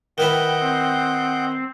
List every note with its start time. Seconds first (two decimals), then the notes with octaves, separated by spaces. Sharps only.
0.18 D#3 E4 B4 D#5 F#5 G5
0.60 C4